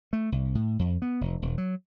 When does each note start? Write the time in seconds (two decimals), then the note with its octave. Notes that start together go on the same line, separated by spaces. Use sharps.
0.13 A3
0.32 C2
0.55 A2
0.79 F2
1.02 B3
1.21 F1
1.42 E1
1.58 F#3